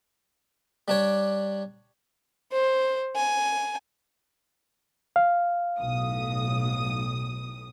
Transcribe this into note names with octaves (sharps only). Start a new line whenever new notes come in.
G3 D4 C#5
C5
G#5
F5
B1 A2 D#6